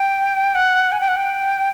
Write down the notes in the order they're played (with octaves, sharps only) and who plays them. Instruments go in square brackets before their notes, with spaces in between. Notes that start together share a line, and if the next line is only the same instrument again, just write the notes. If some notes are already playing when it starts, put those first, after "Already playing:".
Already playing: [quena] G5
F#5
G#5
G5
F#5
G5